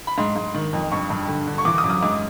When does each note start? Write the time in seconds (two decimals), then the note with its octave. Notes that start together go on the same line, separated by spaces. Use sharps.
0.07 B5
0.18 G#2 C6
0.36 G#2
0.54 D#3
0.73 F2
0.92 G2 C#6
1.10 G2
1.28 D3
1.47 D3
1.58 C#6
1.65 E3 D6
1.78 D#6
1.84 F#2 D6
1.90 D#6
2.01 G#2 D6